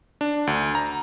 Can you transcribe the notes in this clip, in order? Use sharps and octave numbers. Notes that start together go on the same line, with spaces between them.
D4
D2
A#5